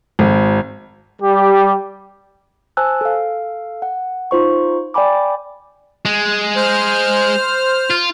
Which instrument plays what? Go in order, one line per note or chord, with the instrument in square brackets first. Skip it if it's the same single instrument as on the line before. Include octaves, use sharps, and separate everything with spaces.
[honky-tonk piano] G#1
[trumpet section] G3 G4
[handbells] C5 G#5 A5 E6 F#6
A4 F5
F#5
D#4 F4 C5 C#6
D5 G5 G#5 B5 D6
[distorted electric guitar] G#3
[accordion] C5 F6
[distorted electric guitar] F4